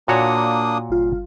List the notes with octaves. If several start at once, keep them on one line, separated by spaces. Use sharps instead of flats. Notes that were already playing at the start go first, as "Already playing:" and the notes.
A#2 A#3 D4 F#4 C#5 D#6
G1 F4